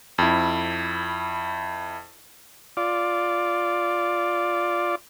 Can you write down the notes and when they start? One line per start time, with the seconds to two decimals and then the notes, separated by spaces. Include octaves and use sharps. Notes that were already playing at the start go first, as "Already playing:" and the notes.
0.18 F2 E4
2.77 F4 D5